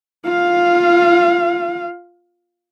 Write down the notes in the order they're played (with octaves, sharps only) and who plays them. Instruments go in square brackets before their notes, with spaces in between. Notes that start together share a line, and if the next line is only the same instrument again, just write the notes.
[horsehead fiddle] F4 F5